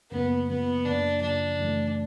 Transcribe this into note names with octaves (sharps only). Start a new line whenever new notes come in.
F#2 C#3 F3 A#3 B3
F#2 C#3 F3 A#3 B3
F#2 C#3 F3 A#3 D4
F#2 C#3 F3 A#3 D4
F#2 C#3 E3 A3